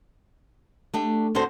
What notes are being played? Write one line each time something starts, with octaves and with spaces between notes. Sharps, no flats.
A3 D4 G4
D2 D3 F#4 A4 C5